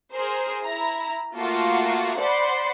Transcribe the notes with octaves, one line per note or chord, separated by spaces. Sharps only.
G#4 A#4 C5
E4 A#5
A3 A#3 F4 F#4
C5 D5 F#5 B5 C6